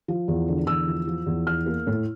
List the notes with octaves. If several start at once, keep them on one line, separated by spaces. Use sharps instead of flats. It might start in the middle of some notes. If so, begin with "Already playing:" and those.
F3
E2
D3
E2 E6
F3
F3
E2
E3 F6
A#3
A2